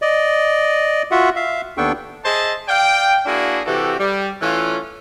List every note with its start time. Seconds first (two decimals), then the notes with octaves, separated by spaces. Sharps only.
0.02 D5 D#5
1.11 F4 F#4 E5 F#5
1.36 E5 F5
1.77 D#2 B3 D4 A4 G5 C#6
2.25 G#4 C5 D#5 E5 A5
2.69 D5 F5 G5
3.26 A#3 D4 E4 F#4 G#4
3.67 C3 E3 F#4 G4 A4
3.99 G3
4.41 E3 A3 C#4 F4